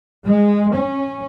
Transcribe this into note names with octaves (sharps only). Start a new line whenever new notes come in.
G#3
C#4